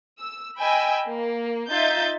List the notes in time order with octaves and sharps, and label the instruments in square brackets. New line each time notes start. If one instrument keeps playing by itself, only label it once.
[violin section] E6
D#5 G5 G#5 B5 E6
A#3
D#4 F4 E5 G6 A6